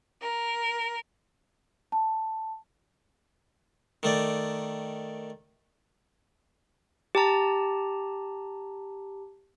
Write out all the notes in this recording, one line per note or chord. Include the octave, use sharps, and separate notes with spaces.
A#4
A5
D#3 A3 D5
G4 A5 A#5